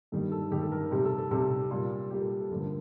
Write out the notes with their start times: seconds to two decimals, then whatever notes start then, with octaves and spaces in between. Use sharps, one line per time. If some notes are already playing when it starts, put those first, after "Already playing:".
0.12 G2 D#3 G3 A4
0.32 A4
0.51 G2 D#3 G3 G4
0.62 A4
0.72 A#4
0.92 C3 G3 G4
1.05 A4
1.18 A4
1.31 C3 G3 A4
1.71 A#2 G3
2.11 A#2 G3 G4
2.21 A4
2.30 G4
2.40 A4
2.50 G2 D3 F3 A3 A4
2.60 A#4